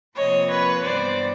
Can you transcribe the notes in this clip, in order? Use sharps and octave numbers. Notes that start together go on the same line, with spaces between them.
C3 F3 A#3 C#5 D#5
B4 C#5
G2 E3 G3 B3 C5 D5